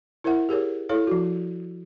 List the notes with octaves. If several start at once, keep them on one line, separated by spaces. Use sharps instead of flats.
E4 A#4 C5 E5 F#5
G4 G#4 A#4 C#5
E4 A4 C#5 F5
F3 F#4